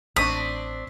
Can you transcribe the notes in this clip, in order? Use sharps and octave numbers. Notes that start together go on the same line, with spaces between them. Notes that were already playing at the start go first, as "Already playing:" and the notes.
A1 C4 D4 C#6 D#6 B6